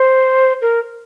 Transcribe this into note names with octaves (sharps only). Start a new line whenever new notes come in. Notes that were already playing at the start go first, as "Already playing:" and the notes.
Already playing: C5
A#4